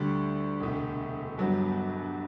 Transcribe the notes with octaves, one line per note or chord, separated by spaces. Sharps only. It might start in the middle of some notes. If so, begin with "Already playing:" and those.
Already playing: D2 D3 G3
E1 D2 C3
G1 G2 F#3 B3